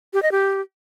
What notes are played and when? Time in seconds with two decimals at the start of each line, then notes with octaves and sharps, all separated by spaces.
0.13 G4
0.23 D#5
0.32 G4